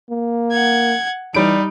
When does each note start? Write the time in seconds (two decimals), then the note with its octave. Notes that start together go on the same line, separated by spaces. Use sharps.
0.10 A#3
0.52 F#5 G#6
1.34 E3 G3 D#4 D7